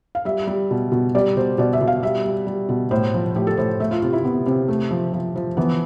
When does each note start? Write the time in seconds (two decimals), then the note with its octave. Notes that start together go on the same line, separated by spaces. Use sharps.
0.15 F5
0.25 G3 E5
0.47 G3
0.71 B2
0.92 B2
1.15 G3 D5
1.36 B2 C5
1.58 B2 D5
1.73 E5
1.81 B2
1.88 F5
2.03 G3 E5
2.25 G3
2.47 G3
2.69 B2
2.91 A2 C5
3.14 F3
3.35 A2 G4
3.47 A4
3.57 A2 C5
3.80 A3 E5
3.91 F4
4.02 C3 F4
4.13 E4
4.24 C3 B3
4.46 C3 C4
4.68 A3
4.91 F3
5.14 F3
5.36 F3
5.57 E3 B3